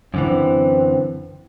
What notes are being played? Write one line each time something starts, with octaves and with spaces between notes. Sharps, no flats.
F#2 D3 E3 C4